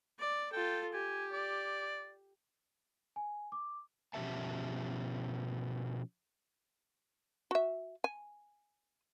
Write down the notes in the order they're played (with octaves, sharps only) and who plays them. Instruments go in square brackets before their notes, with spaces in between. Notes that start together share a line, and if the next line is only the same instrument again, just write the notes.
[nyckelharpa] D5
[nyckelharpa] F4 A4 [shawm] G5
[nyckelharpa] G4 [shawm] G#5
[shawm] D5
[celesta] G#5
D6
[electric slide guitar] B2 F3 C#4 G4 E5 A5
[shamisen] F#4 E5
G#5